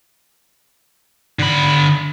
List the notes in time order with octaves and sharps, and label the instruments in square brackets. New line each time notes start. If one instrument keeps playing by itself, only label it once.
[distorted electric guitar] D3 B5